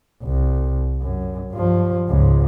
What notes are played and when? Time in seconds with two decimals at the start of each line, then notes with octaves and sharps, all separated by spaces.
0.22 C2
1.01 F#2
1.52 G2 F3
2.09 C#2 G#2